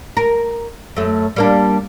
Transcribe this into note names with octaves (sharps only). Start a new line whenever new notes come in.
A#4
F#2 A3
G3 A#3 D4